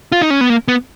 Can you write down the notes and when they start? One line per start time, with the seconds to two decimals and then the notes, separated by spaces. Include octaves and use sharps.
0.12 F4
0.21 D#4
0.30 C#4
0.41 B3
0.50 A#3
0.68 B3